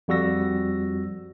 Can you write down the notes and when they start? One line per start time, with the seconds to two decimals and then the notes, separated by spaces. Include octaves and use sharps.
0.08 F2 G3 F#4 E6 A#6